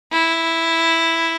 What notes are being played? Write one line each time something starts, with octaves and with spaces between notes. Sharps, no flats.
E4